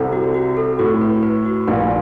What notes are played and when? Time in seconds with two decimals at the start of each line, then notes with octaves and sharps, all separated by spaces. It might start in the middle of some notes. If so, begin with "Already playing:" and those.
Already playing: C2 C3 A4
0.12 F#4
0.34 F#4
0.57 A4
0.79 A2 F#4
1.01 B4
1.23 B4
1.45 F#4
1.67 A#1 A#2 B4